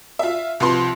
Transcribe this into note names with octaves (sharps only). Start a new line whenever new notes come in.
F4 E5
C2 F3 B4 C6